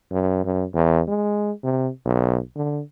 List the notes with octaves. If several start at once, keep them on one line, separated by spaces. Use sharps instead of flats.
F#2
F#2
E2
G#3
C3
B1
D3